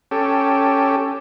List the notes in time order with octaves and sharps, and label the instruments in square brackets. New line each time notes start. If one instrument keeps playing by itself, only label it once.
[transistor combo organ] C#4 G4 A4